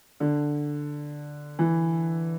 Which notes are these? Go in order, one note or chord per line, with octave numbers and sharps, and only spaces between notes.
D3
E3